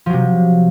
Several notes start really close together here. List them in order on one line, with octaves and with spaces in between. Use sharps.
F3 F#3 C3